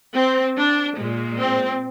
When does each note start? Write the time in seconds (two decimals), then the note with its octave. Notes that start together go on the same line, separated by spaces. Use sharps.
0.14 C4
0.57 D4
0.97 A#2 G#3
1.40 C4